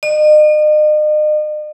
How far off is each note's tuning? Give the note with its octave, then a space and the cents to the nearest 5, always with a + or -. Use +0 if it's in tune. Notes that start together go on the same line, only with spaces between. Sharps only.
D#5 -40